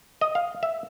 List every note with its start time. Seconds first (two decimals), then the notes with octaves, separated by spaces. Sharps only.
0.21 D#5
0.35 F5
0.63 E5